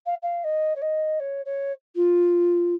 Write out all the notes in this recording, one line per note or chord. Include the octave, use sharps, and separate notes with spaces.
F5
F5
D#5
C#5
D#5
C#5
C#5
F4